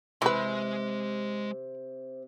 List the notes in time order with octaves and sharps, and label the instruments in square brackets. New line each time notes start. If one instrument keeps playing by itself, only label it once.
[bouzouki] C3 [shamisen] E3 B4 [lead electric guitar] G#3 C6